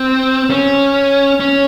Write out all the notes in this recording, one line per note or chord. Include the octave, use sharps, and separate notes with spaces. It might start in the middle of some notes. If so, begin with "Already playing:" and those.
Already playing: C4
C#4
C#4